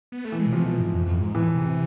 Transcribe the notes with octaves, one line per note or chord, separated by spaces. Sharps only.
B3
A3
E3
G#3
B2
C3 F3
B2
G#2
F2
F2
G#2
A2 E3
C3